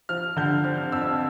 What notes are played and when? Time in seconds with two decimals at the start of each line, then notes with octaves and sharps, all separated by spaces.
0.09 F3 F6
0.37 D3 G6
0.64 C4 F6
0.92 F2 E6